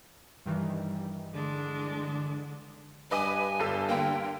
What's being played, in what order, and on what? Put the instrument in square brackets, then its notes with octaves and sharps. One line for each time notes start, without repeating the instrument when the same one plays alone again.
[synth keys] G2 D#3 E3 [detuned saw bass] G3
[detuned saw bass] D3 [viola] G#3 D4
[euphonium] G2 [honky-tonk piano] B4 D#5 D6 [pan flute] G#5
[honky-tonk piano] G1 A4 E6
[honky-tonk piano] D3 A#3 [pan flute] G5